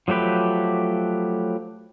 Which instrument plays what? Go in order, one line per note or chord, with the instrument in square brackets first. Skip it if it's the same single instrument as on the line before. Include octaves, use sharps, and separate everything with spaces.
[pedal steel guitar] F3 F#3 A3 G4 B4